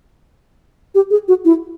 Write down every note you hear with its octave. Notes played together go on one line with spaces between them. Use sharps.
G4
G#4
F#4
E4